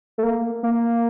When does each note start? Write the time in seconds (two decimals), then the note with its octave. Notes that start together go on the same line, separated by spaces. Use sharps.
0.18 A3
0.23 A#3
0.63 A#3